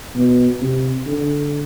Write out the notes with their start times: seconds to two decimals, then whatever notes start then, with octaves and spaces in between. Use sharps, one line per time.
0.15 B2
0.62 C3
1.07 D3